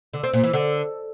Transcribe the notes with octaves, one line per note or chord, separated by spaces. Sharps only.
D3
C4
A#2
E3
D3